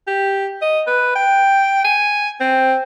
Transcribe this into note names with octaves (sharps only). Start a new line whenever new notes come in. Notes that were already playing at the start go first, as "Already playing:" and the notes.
G4
D#5
B4
G5
G#5
C4